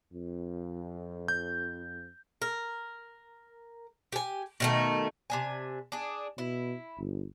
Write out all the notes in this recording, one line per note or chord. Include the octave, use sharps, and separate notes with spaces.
F2
G6
A#4
G4 G#5
B2 D#3 A3
C3 D4 G#5
D4 G#4
B2 E4
G1